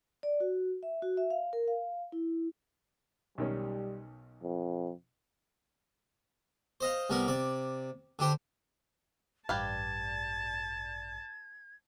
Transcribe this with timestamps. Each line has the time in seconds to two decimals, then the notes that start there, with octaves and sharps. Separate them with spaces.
0.23 D5
0.40 F#4
0.83 E5
1.02 F#4
1.17 E5
1.30 F5
1.53 A#4
1.68 F5
2.12 E4
3.38 B1 D#3 G3 C#4
4.43 F2
6.80 C5 D#5 F5
7.10 C2 G3 B3 A#4
7.28 C3 D5
8.19 D3 D4 G4 C5
9.49 A1 G2 G4 B4 D5 F5 A5 G#6